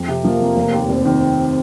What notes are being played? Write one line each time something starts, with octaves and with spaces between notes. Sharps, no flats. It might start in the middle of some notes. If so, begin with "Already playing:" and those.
Already playing: F2
C3
F3 A#3
F2
F1
D#2
F1 C4
D#3